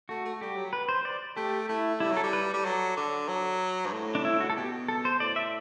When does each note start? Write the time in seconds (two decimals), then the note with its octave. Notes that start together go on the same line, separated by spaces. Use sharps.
0.09 A3 F#4
0.25 A3
0.41 G3 G4
0.57 F#3
0.73 B4
0.89 C5
1.05 D5
1.36 A3 G4
1.68 A3 E4
2.00 G3 E4
2.12 F#3 A4
2.23 G3
2.33 B4
2.49 G3 A4
2.65 F#3
2.97 D3
3.28 F#3
3.86 G2
3.92 A2
4.15 D4
4.25 E4
4.40 F#4
4.50 A4
4.56 B2 G4
4.88 A4
5.05 C5
5.20 A2 D5
5.36 E5